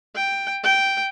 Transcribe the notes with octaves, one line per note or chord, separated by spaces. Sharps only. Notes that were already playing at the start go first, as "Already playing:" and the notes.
G5
G5